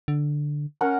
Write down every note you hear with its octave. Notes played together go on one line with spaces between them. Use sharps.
D3
C#4 A#4 F#5